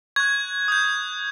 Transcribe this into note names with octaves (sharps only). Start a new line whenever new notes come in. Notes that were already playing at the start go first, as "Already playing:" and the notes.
C#6 F#6 G#6
D#6 G6